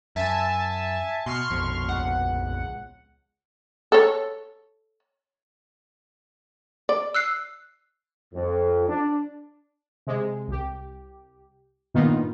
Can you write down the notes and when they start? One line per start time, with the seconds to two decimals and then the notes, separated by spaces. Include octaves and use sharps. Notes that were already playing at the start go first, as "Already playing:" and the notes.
0.16 F#2 E5 G#5 A5
1.26 B2 C6 C#6 F6
1.50 A#1 F2 B2
1.88 C#2 F#5
3.92 A4 C#5
6.89 D5
7.14 E6 F#6 C7
8.34 F2
8.87 D4
10.07 C3 G#3
10.48 C2 G4
11.94 G2 A#2 D#3 B3 D#4 F4